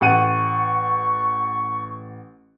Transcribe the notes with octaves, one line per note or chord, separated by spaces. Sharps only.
A1 F#5 C#6 D#7